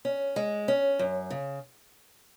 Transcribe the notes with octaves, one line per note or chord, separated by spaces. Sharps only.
C#4
G#3
C#4
F#2
C#3